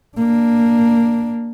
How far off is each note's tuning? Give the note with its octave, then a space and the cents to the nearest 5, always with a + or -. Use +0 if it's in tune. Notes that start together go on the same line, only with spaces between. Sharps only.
A#3 +0 D4 +0